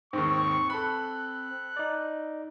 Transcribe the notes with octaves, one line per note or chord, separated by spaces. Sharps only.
D#2 G#2 C4 C#6
A4 B5 F#6
D#4 D5